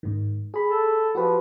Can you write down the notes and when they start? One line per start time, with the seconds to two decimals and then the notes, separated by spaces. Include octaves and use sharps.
0.03 G#2 D#3
0.54 G#4 B5
0.69 A4
1.15 F3 F#4 G4 B4